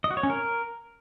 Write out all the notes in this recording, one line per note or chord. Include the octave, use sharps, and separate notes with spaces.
D#5
F#4
C#5
C#4
A#4